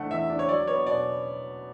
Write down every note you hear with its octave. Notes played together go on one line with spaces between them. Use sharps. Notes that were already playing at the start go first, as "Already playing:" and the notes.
Already playing: E2 D3 A3 D4 F#5
E2 E5
D4
C#5
F#3 D5
B3 C#5
B2 D5